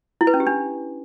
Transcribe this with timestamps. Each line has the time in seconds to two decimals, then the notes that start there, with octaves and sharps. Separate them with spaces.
0.21 E4
0.27 B4
0.34 C#4
0.40 G4
0.47 D4